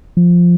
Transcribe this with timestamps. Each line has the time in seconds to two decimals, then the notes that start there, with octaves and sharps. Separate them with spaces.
0.17 F3